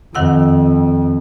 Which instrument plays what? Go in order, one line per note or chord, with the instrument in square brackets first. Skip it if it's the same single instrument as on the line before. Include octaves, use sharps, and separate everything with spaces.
[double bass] F2 [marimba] D#3 F#5 E6